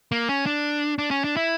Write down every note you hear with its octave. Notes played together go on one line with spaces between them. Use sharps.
A#3
C#4
D4
D4
C#4
D4
E4